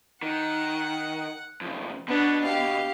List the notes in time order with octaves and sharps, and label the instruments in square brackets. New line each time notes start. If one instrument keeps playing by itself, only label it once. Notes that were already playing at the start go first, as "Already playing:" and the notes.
[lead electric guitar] D#3 [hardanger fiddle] F#5
[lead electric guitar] F2 C#3
[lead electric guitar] B2 [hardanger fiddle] B3 D4
[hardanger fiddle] G4 F5